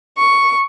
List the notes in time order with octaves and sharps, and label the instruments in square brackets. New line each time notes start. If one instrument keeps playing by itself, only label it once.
[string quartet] C#6